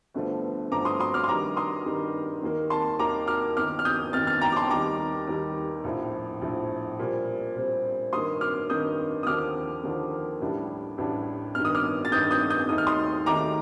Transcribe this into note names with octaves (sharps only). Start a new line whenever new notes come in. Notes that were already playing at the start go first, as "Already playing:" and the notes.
G1 G2 D3 F3 A3
G1 G2 D3 F3 A3 A#5 D6
C6 D#6
C6 D#6
D6 F6
C6
G2 D#3 G3 A#5 D6
C6 D#6
G2 D#3 G3
D#2 D#3 A#3
A5 C6
D#2 D#3 A#3 A#5 D6
D6 F6
G1 F2 D#3 D6 F6
F6
D#6 G6
G1 F2 D#3 F6 A6
F6 A6
G5 A#5
D6
A5 C6
D#2 D#3 G3 A#5 D6
D#2 D#3 G3
A#1 A2 F3
A#1 A2 F3
A#2 G3 C4
A#2 G3 C4
G2 D#3 A#3 C6 D#6
D6 F6
G2 D#3 A#3 D#6 G6
D#6
D#2 D3 F3 A#3 D6 F6
D#2 D3 F3 A#3
A1 A2 G3 D4
A1 A2 G3 D4
G1 G2 D#3 F6
D#6
D6 F6
A6
G1 G2 D#3 D#6 G6
D#6 G6
D#6 G6
D#2 D#3 A3 D#4 D#6
F6
C6 D#6
D#2 D#3 A3 D#4 A#5 D6